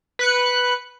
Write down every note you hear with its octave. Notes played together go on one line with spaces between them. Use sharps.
B4 F#6 C#7